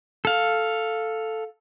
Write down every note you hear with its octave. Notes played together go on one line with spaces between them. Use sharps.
A4 F5